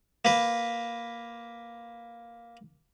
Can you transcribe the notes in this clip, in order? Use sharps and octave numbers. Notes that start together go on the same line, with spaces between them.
A#3 B4